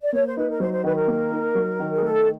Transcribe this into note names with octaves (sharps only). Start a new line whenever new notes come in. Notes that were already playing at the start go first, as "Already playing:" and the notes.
D5
A#3 C#5
C5
D#4 B4
A#4
F#3 C5
C5
D#3 B4
A#4
A#3
D#4
F#3
D#3
G#4
A3 A4